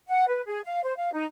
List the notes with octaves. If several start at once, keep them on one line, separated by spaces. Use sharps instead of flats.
F#5
B4
G#4
F5
C5
F5
D#4